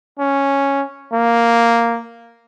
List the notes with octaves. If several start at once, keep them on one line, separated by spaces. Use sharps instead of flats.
C#4
A#3